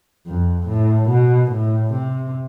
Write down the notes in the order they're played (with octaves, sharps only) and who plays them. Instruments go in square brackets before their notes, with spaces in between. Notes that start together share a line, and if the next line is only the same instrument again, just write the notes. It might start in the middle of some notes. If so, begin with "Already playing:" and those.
[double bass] F2
A2
B2
A2
C3